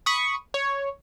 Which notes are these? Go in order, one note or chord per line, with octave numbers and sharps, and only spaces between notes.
B5 C#6 D#6
C#5